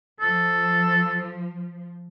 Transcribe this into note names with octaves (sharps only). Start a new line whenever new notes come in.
F3 A4